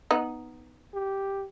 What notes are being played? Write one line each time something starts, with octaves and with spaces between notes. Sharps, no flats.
B3 D#4
G4